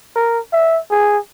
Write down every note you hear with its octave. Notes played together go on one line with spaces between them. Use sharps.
A#4
E5
G#4